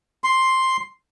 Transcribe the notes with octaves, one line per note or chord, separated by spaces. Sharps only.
C6